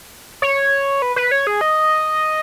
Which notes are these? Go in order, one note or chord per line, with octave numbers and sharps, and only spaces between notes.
C#5
B4
B4
C#5
G#4
D#5